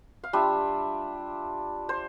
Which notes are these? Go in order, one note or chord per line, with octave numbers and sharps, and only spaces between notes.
F5
G3 D4 F4 E5
C5